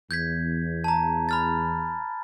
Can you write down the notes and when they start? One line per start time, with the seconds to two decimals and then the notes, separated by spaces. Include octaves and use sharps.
0.11 E2 G6 G#6 B6
0.84 A5 A#5
1.29 B5 F6 A6